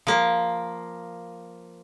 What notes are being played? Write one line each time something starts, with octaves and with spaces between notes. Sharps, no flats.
F3 A#3